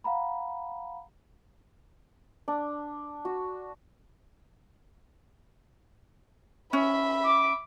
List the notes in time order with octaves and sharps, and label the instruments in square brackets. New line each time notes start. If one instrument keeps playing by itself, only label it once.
[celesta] F5 F#5 A#5 B5
[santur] D4
F#4
[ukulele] C#4 [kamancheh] E5 B5
[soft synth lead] D6